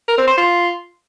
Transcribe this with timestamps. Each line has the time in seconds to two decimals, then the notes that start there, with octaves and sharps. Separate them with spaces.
0.08 A#4
0.18 C4
0.28 C5
0.37 F4